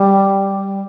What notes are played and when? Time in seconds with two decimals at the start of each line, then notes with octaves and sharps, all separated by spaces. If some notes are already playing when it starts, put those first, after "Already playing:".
Already playing: G3